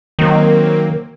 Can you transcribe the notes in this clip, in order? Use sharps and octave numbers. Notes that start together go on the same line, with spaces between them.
D#3 F#3 A#3 C4